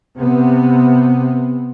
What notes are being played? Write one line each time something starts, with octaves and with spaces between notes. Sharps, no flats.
C3 B3